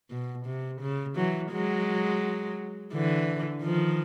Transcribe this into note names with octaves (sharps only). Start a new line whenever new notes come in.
B2
C3
C#3
E3 F#3
F#3 G#3
D3 E3
D#3 F3